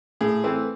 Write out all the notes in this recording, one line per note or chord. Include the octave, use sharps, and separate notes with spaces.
A2 G#4
E3 A3 C4